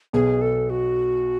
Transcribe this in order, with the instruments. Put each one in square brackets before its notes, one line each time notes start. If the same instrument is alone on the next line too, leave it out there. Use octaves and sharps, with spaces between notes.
[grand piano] B1 B2 [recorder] G#4
[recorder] A4
F#4